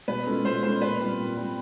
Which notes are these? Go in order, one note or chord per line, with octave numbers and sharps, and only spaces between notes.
B2 B4
G#3 C#4 F4 A4
B2 C5
G#3 C#4 F4 A4 C5
A#2 B4
G3 C4 F4
A#2
G3 C4 F4